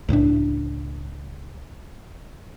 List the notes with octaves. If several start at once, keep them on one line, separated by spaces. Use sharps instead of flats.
C#2 A2 F3 D4